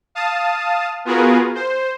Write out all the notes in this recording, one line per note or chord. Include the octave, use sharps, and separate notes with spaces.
F5 A5 D#6
B3 F4 F#4 G#4 A#4 B4
C5